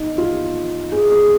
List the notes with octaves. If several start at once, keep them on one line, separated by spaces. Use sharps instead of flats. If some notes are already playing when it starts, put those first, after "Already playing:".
Already playing: D#4
F4
G#4
G#4